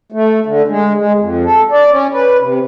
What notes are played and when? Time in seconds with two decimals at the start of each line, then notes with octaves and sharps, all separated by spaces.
0.12 A3
0.46 D3
0.68 G#3
0.97 G#3
1.19 F2
1.45 A4
1.72 D5
1.91 C#4
2.13 B4
2.40 C3